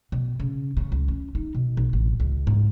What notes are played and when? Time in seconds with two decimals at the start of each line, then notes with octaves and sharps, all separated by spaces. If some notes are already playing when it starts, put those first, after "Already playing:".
0.12 B2
0.40 C#3
0.77 C#3
0.92 C#2
1.08 C#4
1.35 D#4
1.55 B2
1.77 B1
1.93 A1
2.20 C#2
2.47 G#2